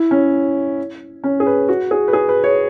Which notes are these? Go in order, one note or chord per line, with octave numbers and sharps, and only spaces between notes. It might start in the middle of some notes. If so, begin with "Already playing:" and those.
Already playing: E4
C#4
C#4
G#4
B4
F#4
G#4
B4
G#4
B4
C#5